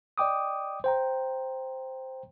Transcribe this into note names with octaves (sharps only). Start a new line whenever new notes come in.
D5 D#5 G5 D6 D#6
C5 G5 A#5